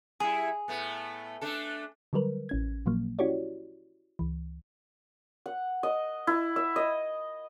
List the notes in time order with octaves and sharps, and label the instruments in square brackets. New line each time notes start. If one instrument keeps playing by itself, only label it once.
[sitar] G3 E4 [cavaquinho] G#4
[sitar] A2 A3 B3
A3 D4 A4
[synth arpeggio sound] D3 F#3 G3 A#4 B4
A1 C#4 G#6
A#2 F3 F#3 A#3
C#4 E4 F#4 G4 C#5 D5
C#2 E3
[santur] F#5
D#5
E4
E5
D#5